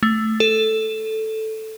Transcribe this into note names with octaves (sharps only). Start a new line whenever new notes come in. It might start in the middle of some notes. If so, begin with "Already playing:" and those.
A3
A4